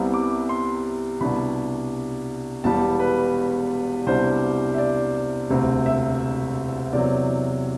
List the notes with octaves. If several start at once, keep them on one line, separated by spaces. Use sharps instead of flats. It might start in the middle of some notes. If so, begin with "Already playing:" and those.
Already playing: C2 C3 G3 B3
D6
C6
C2 B2 G3 D4 B5
E1 E2 B2 G3 B3 A5
B4
C2 B2 G3 D4 C5
E5
D5
E1 D2 C3
E5
E2 C3 F#3 D5